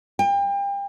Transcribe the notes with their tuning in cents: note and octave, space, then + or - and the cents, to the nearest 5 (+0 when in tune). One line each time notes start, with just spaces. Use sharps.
G5 +35